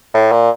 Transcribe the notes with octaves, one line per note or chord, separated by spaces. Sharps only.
A2
A#2